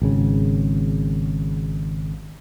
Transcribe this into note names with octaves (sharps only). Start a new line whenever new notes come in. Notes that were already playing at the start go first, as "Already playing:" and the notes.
G#1 C#3